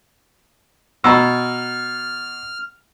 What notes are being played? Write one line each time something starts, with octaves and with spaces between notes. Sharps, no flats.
B2 A#5 E6 F6